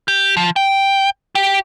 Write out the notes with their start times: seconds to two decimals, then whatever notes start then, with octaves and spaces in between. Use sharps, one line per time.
0.08 G4
0.37 F3
0.56 G5
1.35 G4